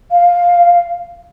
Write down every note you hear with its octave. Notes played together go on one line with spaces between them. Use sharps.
F5